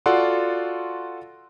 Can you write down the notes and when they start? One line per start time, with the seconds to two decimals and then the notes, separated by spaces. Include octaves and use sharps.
0.06 F4 F#4 A4 D5 F#5 C6